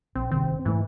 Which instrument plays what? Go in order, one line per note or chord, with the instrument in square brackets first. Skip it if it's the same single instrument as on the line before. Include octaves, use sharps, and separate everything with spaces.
[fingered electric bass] A#1 [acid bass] C4
[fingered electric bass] G1 C3 D#3 [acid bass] C4
[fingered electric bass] G#2 A3 [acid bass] E3